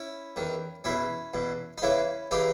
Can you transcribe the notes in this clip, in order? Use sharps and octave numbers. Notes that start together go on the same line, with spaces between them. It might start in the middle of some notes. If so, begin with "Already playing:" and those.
Already playing: C#4 E4
E2 D#3
E2 B2 C#4 E4
E2 B2
D#4
E2 C#3 E3 C#4 E4
C#3 E3 D#4 G4